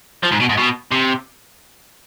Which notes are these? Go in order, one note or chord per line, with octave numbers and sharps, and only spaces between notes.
F3
G#2
B2
G#2
B2
C3